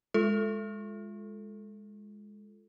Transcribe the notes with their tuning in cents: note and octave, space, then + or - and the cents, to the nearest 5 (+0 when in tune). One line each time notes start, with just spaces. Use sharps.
G#3 +0 F4 +0 A4 +5